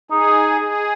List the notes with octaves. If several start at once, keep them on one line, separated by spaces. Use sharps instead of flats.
D#4 G#4
G#4